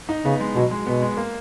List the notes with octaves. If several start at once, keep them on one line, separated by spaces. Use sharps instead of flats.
D#4
C#3 B3
G#3
B2 F#3
G#3
B2 B3
G#3
A#3